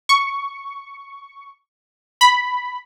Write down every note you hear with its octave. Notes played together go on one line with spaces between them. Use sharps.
C#6
B5